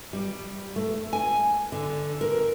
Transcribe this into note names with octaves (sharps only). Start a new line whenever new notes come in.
G3
A3
G#5
D3
A#4